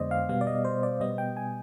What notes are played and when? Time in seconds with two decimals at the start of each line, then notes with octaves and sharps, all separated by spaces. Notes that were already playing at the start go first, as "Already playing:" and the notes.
Already playing: F2 D3 G#3 B3 C5 D5 D#5
0.11 F5
0.29 B2 G3 B3 F5
0.41 D5
0.47 D#5
0.65 C5
0.83 D5
1.00 B2 G3 B3 D#5
1.18 G5
1.37 G#5